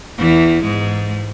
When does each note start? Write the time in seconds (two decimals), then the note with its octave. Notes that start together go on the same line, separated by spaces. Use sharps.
0.19 E2 E3
0.64 G#2 G#3